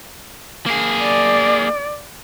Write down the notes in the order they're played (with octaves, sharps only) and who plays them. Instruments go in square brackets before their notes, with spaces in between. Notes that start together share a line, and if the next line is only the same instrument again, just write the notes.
[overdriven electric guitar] A#3 G#4
[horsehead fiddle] D5